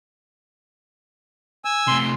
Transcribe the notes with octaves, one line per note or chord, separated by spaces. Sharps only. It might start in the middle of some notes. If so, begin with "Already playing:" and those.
G#5 E6
C3 A3 C6